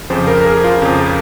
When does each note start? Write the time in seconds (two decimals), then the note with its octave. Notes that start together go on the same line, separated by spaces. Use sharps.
0.10 F2 C#3 F3 C5
0.27 A#4
0.42 A#4
0.46 G#4
0.64 F4
0.82 F2 C#3 F3